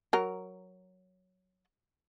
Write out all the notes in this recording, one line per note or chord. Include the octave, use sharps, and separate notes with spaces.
F#3 A#4